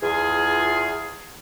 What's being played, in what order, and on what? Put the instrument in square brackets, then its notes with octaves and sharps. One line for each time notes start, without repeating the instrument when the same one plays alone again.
[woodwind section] E2 F4 G#4